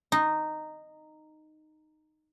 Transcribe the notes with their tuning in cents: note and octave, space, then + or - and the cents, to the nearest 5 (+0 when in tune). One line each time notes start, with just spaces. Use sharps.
D#4 -10 C6 +35